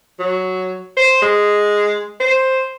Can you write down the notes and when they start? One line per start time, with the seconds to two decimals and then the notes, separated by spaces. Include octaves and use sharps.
0.20 F#3
0.97 C5
1.22 G#3
2.20 C5